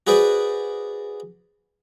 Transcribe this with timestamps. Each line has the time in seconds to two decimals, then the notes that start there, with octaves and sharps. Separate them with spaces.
0.07 F#4 G#4 B4 C5 D5